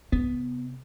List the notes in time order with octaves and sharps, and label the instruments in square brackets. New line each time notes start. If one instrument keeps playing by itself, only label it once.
[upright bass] C3 [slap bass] B3